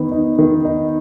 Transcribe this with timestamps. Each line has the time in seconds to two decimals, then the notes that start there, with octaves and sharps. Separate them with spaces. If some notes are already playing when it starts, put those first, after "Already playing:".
Already playing: D#3 B3
0.12 D#4
0.38 D#3
0.65 D#4